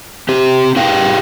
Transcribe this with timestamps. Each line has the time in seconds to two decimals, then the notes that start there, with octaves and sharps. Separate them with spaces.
0.29 C4 G4
0.76 G4 G#4 F5 G5